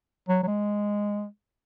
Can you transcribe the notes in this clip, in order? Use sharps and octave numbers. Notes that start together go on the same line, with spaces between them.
F#3
F#3
G#3